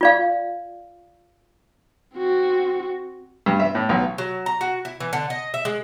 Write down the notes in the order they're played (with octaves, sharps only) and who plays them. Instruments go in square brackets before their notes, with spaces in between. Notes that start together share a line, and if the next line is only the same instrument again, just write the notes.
[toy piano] F4 D5 F5
[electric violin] C4 F#4
[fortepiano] G2
E5
A2
B1
[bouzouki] F#3
A#5
F#4
E4
E3
D3
D#5
E5
G#3